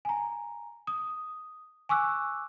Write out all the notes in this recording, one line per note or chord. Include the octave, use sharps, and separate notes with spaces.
G#5 A#5
D#6
G#5 C#6 D6 E6 F#6